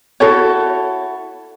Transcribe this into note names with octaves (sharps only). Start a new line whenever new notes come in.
E4 F#4 A4 C#5